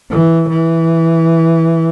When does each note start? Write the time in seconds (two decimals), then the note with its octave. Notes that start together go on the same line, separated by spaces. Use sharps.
0.11 E3
0.49 E3